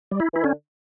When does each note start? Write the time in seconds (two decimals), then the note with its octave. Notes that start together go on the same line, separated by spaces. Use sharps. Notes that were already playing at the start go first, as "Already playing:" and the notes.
0.11 G3
0.20 E4
0.33 E3 E4
0.43 D3 C#4